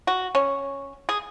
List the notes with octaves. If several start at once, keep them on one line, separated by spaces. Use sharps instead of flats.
F#4
C#4
G#4